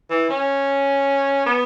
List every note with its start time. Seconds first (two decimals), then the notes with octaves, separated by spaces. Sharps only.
0.10 E3
0.30 C#4
1.46 B3